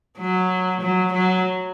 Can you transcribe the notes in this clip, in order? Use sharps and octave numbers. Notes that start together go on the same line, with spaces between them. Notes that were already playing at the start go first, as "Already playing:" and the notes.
F#3
F#3
F#3